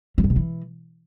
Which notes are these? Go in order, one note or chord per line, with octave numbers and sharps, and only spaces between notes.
F#3
G2
C3
E3